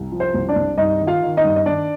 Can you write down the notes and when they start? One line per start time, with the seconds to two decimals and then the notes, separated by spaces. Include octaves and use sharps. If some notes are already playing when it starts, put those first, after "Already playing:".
Already playing: C2
0.12 F3
0.20 C5
0.34 C2
0.49 D4 D5
0.56 C2
0.78 G2 D#4 D#5
1.00 D#3
1.07 F4 F5
1.23 D#3
1.37 D#4 D#5
1.45 G2
1.56 D#5
1.66 D#3 D4 D5